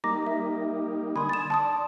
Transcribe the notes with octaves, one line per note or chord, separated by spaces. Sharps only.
G3 A#3 D#4 A#5 D6 A#6
E5
D3 G#5 B5 C6 D#6
A6 E7
D5 A5 C6 D#6